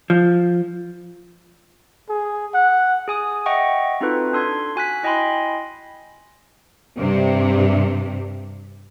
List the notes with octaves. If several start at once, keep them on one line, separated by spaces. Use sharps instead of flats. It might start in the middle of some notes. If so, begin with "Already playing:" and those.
F3
G#4
F#5
G#4 G#5 D#6
D#5 E5 F#5 G5 C#6
C4 D#4 F4 F#4 A4 B4
D4 A4 C6 G#6
F#4 G#5 F#6 B6
E4 D#5 G5 G#5 B5 C6
G2 C3